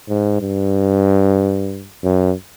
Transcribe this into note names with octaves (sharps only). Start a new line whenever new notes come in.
G#2
G2
F#2